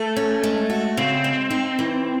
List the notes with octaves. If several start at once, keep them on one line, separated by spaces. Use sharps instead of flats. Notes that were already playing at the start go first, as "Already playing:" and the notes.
Already playing: A3 A4
C#4
G#3
F#4
C#3 C4
G#3
D#4
E3